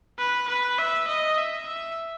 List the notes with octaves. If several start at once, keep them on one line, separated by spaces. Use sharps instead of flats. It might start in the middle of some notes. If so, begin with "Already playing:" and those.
B4
B4
E5
D#5
E5
E5